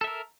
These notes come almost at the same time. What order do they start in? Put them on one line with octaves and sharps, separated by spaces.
A4 E5 A#4